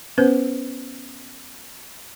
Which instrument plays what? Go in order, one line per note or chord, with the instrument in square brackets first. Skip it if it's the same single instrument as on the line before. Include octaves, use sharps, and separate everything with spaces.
[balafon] B3 C#4 B4 C5